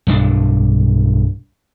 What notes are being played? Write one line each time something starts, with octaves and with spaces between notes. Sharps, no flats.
B1 G2 E3 D4